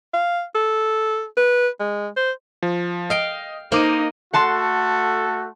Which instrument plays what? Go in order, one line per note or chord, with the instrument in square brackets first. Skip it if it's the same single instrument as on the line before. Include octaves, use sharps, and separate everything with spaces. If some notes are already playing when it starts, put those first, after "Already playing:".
[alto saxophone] F5
A4
B4
G#3
C5
[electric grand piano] F3
[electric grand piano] D#5 [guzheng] F5 G5
[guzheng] A#3 [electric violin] D#4 D#5 [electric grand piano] C5 D6 D#7
[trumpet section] A3 F#4 A4 [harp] F#5 A5 C6